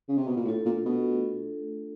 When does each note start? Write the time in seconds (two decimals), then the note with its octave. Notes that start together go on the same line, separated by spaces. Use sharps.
0.09 C#3
0.18 C3
0.27 B2
0.37 A#2
0.46 A2 A3 D4 F4 A4
0.65 A#2
0.85 B2